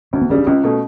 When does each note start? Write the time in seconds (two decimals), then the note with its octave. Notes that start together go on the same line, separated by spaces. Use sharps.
0.13 D2 C#4
0.22 B3
0.30 C#3 G3 C#4
0.38 D4
0.47 C#2 C#4
0.64 B2 A3